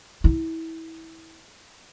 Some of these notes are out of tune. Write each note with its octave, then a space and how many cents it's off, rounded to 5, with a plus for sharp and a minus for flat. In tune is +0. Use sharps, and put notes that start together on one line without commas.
E4 -25